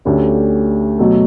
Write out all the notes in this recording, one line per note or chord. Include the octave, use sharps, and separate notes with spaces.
D2 D3 A3 C#4 G4
B2 F#3 A3